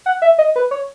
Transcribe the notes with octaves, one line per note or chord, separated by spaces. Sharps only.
F#5
E5
D#5
B4
C#5